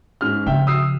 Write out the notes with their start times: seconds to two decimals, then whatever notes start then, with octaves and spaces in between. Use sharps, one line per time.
0.21 G#2 C#4 F6
0.47 C#3 F3 E5 G5
0.67 D#6 E6 C7